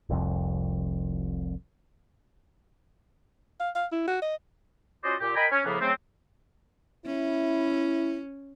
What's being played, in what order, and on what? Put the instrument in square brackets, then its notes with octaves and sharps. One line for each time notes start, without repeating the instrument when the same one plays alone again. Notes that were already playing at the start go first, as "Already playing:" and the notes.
[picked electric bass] F1 C2 F2
[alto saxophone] F5
F5
E4
F#4
D#5
[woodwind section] C#4 F4 F#4 C5 D5 D#5
A#2 G4
A#4 D#5 G5 G#5 A#5 B5
C#4
A2 C#3 F3 A#3 B3
C#3 F#3 A3 C4
[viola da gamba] C#4 [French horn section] E4